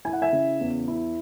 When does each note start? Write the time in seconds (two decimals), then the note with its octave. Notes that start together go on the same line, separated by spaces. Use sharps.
0.05 E4 G#5
0.13 F#5
0.22 E5 G#5
0.32 C#3
0.60 E2
0.88 E4